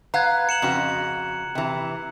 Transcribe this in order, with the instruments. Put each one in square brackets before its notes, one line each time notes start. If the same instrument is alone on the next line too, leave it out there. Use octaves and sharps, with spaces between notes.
[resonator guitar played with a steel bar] B4 F5 F#5 [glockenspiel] A#5 F#6 G#6
[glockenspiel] C#7 E7 F#7
[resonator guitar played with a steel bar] F2 C#3 F#4
C3 E3